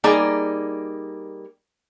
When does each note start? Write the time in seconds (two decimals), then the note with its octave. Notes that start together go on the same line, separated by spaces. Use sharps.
0.04 G3 A#3 D#4 G#4 D5